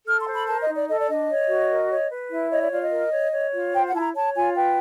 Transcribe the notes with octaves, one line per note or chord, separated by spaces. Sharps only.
A4 F6
C6
C5
B5
A#4 A5
D#5
D#4
D5
A4 D#5
D5
D4 D#5
C#5
F#4
A#4
C#5
B4
E4
C#5 D#5
D5
F4 D5
D#5
A#4
C#5
C#5
F4
C5 G5
F#5
E4 A5
A#5
C#5 A5
F4 G#5
B4 G5